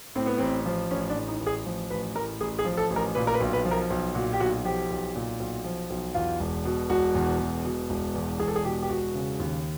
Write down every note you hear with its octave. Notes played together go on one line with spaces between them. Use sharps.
A2 C4
B3
A1 C4
F3
A1 C#4
D4
A2
D#4
A1
G#4
F3
A1 B4
A2 A#4
A1 G#4
G#4
F3
A4
A1
A#4
A#2 B4
A#4
B4
B1
B4
F3
A#4
B1
A#2 F#4
G4
B1 F#4
F3 G4
B1
A#2
B1
F3
B1
E2 F4
E1
B2
E1 F#4
E2
E1
B2
E1
E2
E1 G#4
A4
G#4
B2 G4
G4
E1 F#4
C#3
D#2